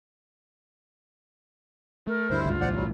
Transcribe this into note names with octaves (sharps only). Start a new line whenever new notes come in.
A3 A#4
D2 G2 D3 G3 E4 C5
C#2 G#2 F4
B1 A2 E3 C5 D5 F#5
B2 F#3 G3